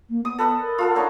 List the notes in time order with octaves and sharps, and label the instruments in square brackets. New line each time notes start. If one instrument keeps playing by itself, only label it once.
[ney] A#3
[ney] B3 [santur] D#6
[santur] A4 B4 D#5
[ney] A#4
[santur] F4 A4 F#5
D4 D#4 C#5